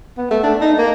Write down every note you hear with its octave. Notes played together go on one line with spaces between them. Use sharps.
B3
A3
D4
D#4
A#3